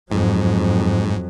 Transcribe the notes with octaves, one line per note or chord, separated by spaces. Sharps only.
F2 G#2 F#3